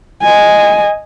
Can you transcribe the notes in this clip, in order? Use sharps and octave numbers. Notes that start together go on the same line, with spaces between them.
D#5 G#5